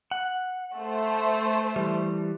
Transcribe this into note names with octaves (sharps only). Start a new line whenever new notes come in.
F#5
A3 C5
E3 G3